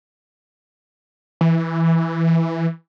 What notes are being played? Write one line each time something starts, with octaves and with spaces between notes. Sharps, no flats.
E3